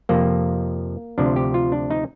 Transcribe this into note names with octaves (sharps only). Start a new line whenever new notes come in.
F2 C3 F3 A#3
D2 C3 F3 D4
G4
F4
D4
D#4